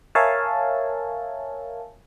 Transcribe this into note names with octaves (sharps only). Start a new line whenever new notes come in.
A#4 C#5 E5 F5 G#5 A5